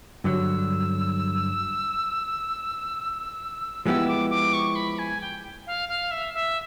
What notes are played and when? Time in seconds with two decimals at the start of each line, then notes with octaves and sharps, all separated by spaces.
0.24 G2 D3 F#3 E6
3.86 F3 G#3 B3 E4 G4 E6
4.08 D6
4.30 D6
4.53 C#6
4.76 B5
4.99 G#5
5.21 G5
5.67 F5
5.89 F5
6.11 E5
6.34 E5